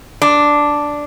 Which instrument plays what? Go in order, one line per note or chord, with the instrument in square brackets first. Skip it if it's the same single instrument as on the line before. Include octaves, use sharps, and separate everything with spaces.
[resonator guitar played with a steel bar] D4